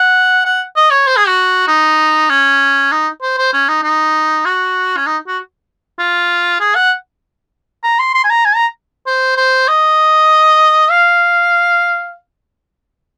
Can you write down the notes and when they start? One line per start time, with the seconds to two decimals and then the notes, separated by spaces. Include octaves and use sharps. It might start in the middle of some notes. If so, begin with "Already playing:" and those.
Already playing: F#5
0.45 F#5
0.76 D#5
0.91 C#5
1.07 C5
1.16 G#4
1.27 F#4
1.68 D#4
2.30 C#4
2.92 D#4
3.22 C5
3.38 C5
3.53 C#4
3.68 D#4
3.83 D#4
4.45 F#4
4.97 C#4
5.06 D#4
5.27 F#4
5.99 F4
6.60 G#4
6.75 F#5
7.83 A#5
7.99 C6
8.14 C6
8.24 G#5
8.30 A#5
8.45 G#5
8.55 A#5
9.07 C5
9.37 C5
9.68 D#5
10.91 F5